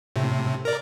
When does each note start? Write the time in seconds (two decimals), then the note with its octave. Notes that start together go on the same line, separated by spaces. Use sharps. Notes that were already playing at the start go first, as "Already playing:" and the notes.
0.16 A2 C3
0.65 A#4 D5